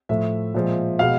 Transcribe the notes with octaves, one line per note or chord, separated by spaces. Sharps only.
A2 F3 A3 E5
A#2 F3 G#3
B2 G#3 F5